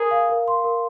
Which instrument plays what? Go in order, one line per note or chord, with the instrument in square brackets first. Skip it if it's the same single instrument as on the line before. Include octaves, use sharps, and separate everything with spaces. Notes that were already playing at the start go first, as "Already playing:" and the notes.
Already playing: [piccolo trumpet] G#4 [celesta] A#4 A#5
[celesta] F5
A#4
C6
A#4